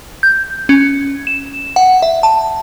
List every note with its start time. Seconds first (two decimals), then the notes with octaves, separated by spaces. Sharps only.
0.23 G6
0.69 C#4
1.27 E7
1.76 F#5
2.02 E5
2.23 A5